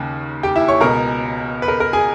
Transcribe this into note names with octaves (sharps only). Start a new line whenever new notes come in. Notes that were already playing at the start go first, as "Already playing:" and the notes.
Already playing: D#2 C#3
G4 G5
E4 E5
C#5 C#6
C#2 B2 A#4 A#5
B4
A#4
A#4
G#4 G#5